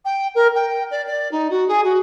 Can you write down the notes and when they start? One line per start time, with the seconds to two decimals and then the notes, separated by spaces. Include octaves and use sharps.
0.05 G5
0.35 A#4
0.55 G5
0.91 D5
1.07 D5
1.31 D#4
1.50 F#4
1.68 G#4
1.84 F#4